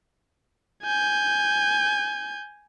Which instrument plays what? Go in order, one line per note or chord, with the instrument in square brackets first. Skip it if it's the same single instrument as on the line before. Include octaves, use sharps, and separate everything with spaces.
[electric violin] G#5 G6